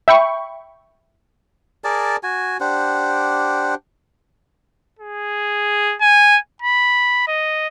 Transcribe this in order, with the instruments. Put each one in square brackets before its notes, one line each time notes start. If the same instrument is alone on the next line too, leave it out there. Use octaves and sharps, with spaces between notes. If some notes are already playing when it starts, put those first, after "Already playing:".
[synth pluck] E5 G5 B5 C#6
[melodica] G#4 A#4 D5 A5
F#4 G#5
D4 G4 C5 F#5
[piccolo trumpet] G#4
G#5
B5
D#5